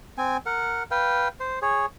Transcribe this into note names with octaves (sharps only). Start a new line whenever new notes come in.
C4 G#5
A#4 F#5
B4 F5 G5
C5
G#4 C#5